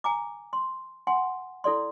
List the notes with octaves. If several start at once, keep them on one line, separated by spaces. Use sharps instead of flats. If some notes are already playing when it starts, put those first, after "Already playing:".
G#5 A#5 D6
C6
F#5 G#5 C6
E4 A4 D5 C6